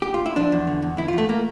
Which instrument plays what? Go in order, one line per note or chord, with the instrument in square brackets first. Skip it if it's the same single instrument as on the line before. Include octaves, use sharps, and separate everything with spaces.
[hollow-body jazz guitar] G4
F4
E4
F3 D4
E2
D3
E2
E2 E4
F4
E2 A3
A#3